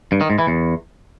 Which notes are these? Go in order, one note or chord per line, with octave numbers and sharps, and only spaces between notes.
G2
D#3
G#2
E3
E2